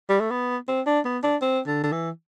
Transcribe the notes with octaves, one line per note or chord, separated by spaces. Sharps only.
G3
A3
B3
C4
D4
B3
D4
C4
D3
D3
E3